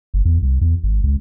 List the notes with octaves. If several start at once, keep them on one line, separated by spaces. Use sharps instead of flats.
G1
E2
C2
E2
G#1
C#2